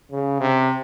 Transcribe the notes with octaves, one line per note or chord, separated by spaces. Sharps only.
C#3
C3